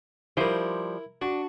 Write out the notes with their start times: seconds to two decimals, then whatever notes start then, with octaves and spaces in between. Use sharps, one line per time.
0.37 F3 G3 E4 A#4 C5
1.22 D4 F#4